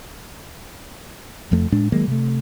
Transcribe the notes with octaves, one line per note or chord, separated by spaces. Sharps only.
F#1 F2 F3 A3
A2 G#3 D4
D#3 F#3 G#3 A#3
C3 A3